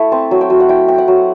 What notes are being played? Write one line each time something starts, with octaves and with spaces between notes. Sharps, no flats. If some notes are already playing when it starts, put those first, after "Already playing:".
Already playing: A3 E4
C4 A5
F#3
G5
F#3
F#5
E4 G5
C4 G5
F#5
F#3